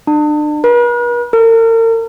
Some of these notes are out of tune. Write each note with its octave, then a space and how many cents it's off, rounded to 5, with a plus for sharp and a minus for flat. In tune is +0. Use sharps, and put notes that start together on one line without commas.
D4 +35
B4 -45
A#4 -40